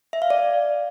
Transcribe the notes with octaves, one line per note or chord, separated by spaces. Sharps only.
E5
F5
D5